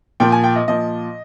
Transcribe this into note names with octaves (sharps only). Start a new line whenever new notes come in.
A#2 F3 G5
G#5
G5
D#5
A#2 F3 D#5